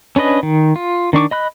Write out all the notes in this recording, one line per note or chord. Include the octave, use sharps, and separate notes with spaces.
C#4 D4 B4 D#5
D#3
F4
D#3 D4 C#6 D6
D#5 B5 F#6